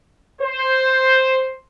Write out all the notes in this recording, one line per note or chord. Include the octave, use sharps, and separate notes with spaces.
C5